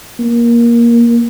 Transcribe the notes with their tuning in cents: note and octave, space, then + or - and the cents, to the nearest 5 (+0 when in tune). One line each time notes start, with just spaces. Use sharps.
A#3 +15